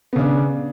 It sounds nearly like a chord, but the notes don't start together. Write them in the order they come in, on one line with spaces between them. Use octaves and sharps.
B3 C#3 D4